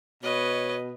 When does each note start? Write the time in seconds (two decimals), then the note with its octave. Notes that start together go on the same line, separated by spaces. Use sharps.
0.23 B2 B4 C#5 D#5